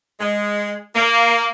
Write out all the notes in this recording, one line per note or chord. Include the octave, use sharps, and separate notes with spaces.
G#3
A#3